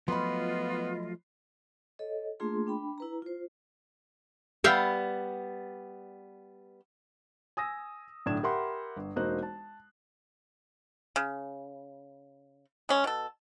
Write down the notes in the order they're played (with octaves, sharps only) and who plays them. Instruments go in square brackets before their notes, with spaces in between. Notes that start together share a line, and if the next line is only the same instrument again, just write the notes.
[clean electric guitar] F3 F#3 A3 [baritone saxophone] B3 [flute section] F4 D#5 [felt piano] B5 C6
[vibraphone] A4 C#5 D#5
A3 A#3 D4 F4 G#4 C6
D4 G5 B5
E4 B4 A#5
F4 C5
[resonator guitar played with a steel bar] G3 B3 [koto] E5 F5 G5
[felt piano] G#5 D#6 E6 A#6
B1 A2 D3 D4 G#6 E7
G4 A#4 E5 F#5 B5 C6
G1
E1 A#3 D#4 F#4 C5 F#6
A5
[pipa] C#3
G#3 C#4
B2 A4